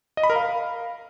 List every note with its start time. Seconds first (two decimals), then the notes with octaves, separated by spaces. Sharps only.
0.17 D#5
0.23 B5
0.30 A#4
0.36 F5